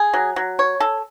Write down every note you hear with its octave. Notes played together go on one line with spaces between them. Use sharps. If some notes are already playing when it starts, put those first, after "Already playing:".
Already playing: G#4
F#3
F#3
C#5
A4